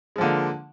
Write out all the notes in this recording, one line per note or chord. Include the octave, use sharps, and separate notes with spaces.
D3 F3 G#3 A#3